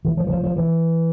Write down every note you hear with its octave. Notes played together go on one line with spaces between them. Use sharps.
E3
F3
E3
F3
F3
E3